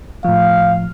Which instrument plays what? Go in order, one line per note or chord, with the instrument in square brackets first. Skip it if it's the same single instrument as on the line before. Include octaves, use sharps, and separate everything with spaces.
[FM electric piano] A2 F3 [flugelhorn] F5